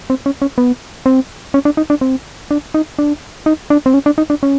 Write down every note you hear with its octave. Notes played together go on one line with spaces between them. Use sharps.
C4
C#4
C#4
B3
C4
C#4
D4
D#4
D4
C4
D4
D#4
D4
D#4
D4
C4
C#4
D4
D#4
D4
C#4